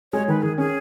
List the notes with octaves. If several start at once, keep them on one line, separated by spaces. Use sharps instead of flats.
G#3 C#5
D#3 B4
D#3 G#4
C#4 G#4